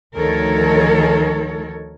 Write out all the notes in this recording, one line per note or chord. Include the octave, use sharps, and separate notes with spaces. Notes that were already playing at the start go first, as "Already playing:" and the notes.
D2 D#3 F3 A4 A#4 C#5